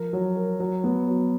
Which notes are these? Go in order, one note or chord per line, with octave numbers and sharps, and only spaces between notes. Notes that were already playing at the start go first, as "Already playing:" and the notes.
Already playing: F3 A#4
F#3
A#4
F#3
B3
F#3